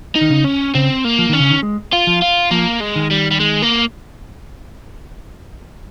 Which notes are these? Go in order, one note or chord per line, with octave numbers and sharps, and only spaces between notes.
D#4
D#3
C#3
C#4
C#3 C4
A#3
F3
D#3 C#4
C#3
D#3
G#3
F4
F3
F4
F3 A#3
G#3
D#3
G3
G3
G#3
A#3